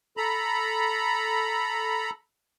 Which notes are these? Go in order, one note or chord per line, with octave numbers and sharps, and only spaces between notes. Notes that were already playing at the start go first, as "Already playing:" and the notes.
A4 A#5 B5